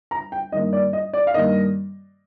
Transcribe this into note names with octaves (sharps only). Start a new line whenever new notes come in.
A#5
G5
G2 D#3 A#3 D#5
D5
D#5
D5
F5
G2 D#3 A#3 D#5